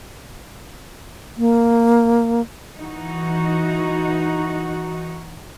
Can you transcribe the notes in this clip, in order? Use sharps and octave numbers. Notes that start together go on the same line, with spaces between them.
A#3
E3 D#4 F#4